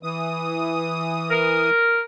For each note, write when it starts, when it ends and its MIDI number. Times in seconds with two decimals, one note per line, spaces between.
0.03 1.70 52
0.03 1.70 87
1.31 2.00 70